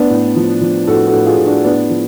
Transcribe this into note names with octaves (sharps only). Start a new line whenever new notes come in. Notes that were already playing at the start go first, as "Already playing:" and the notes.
Already playing: B3 D4
A2
F3
F3
A2 F#4 A4
F#4 A4
A2
F4 G#4
A2
D4 F#4
A2 B3 D4
F3